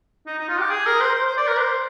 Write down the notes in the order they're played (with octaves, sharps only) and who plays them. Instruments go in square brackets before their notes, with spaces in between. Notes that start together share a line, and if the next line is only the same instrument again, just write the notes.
[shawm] D#4
D#4
F4
G4
G#4
A#4
C5
C5
C5
D5
A#4
C5